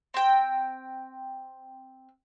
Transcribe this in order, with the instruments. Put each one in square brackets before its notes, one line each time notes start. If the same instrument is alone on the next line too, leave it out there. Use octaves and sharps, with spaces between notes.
[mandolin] C4 G5